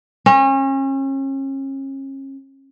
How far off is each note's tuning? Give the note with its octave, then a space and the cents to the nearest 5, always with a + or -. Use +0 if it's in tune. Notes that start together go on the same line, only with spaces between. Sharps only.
C#4 -35